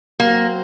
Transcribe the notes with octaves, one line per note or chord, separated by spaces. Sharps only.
F#3 A#3 C4 F#4 C5